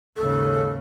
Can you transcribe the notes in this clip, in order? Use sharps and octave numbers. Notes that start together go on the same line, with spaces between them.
D#2 G#2 C#3 A4